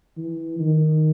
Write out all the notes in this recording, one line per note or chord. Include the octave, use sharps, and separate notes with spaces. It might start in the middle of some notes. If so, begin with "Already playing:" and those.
E3
D#3